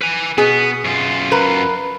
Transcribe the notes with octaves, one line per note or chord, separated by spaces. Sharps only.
B4 G#5
B2 B3 G#4
F#2 F4
A#4 B4